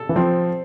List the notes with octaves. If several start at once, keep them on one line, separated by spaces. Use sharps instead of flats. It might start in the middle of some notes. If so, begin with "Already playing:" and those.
Already playing: A4
E3
F3 C4